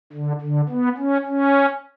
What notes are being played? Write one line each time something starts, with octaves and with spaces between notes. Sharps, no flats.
D3
D3
B3
C#4
C#4